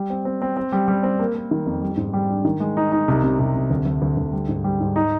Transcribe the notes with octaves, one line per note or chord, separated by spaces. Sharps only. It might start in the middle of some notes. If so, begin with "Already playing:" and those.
Already playing: G3
C4
C4
C4
C4
G3
G3
C4
A#3
A#3
D#3
F2
G3
G#2
G3
D4
D#3
G#3
D#4
D#4
C2
C3
C2
C3
D2
D2
D2
D2
G3
G#2
G3
G#2
D#4